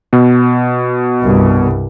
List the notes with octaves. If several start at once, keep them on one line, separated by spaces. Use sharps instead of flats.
B2
C2 G2